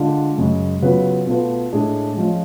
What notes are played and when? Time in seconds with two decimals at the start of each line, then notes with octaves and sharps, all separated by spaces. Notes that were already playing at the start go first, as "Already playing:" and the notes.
Already playing: D3 G#3 D4 F4
0.38 F#2 C#3 G#3
0.82 C#3 F#3 B3 F4 B4
1.27 B2 A3 F4 B4
1.72 A2 G#3 D4 G#4
2.17 F3 G#3 C#4 F4